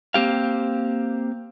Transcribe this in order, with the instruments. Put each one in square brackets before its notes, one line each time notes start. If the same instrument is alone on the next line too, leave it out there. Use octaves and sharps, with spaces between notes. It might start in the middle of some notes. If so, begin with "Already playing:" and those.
[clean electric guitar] A#3 C4 G4 F5